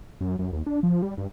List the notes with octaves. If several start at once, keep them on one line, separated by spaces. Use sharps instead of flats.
F#2
F#2
D#2
D4
F3
G3
G2